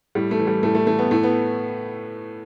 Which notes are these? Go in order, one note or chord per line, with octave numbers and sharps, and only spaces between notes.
A2 G3
A3
E3
G3
A2 A3
A3
E3 A3
B3
A2 A3
B3